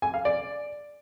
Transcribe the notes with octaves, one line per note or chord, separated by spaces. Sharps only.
G#5
F5
D5